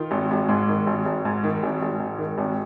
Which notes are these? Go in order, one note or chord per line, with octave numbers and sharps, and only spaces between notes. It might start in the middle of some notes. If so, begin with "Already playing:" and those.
Already playing: D#3 F4
G#1
G#1
G#2
D#3
G#1
G#1
G#2
D#3
G#1
G#1
G#2
D#3
G#1